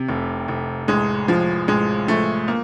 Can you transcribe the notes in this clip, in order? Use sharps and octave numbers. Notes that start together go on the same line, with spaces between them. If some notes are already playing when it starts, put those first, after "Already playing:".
Already playing: C3
F1
F1
A1 G#3
F3
A1 G#3
F3 A3
A#3